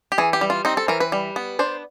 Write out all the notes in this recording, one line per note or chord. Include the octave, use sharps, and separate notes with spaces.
G4
E3 G#4
G4
G3
F4
C4 D#4
A4
E3 A#4
B4
G3
B3
D4 C5